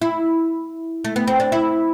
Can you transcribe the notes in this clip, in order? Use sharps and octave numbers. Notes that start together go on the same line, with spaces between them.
E4
A3
B3
C4
D4
E4